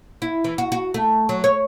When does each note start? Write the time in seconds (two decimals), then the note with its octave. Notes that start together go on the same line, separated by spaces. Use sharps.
0.22 E4
0.44 E3
0.58 F#4
0.72 F#4
0.94 A3
1.29 F#3
1.44 C#5